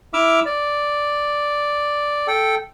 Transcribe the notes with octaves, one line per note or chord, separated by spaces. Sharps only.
E4 E5 D6 E6 F6
D5
A4 G5